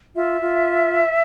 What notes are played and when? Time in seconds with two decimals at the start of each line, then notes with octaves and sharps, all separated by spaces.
0.16 F4 E5
0.41 F4